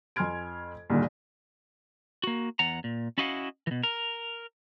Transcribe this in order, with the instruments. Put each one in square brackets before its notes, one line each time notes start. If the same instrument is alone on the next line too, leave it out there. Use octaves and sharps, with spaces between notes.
[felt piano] F2 G#5 C6 F6 G#6 D7
A#1 G2 A#2 D3 D#3
[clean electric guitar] A#3 F#4
E2 F#5 A#5
A#2
C#4 E4 F#4 D#5 F5 F#5
B2 E3
A#4